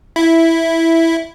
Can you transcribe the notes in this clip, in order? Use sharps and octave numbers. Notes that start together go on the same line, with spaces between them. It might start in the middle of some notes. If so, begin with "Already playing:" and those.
E4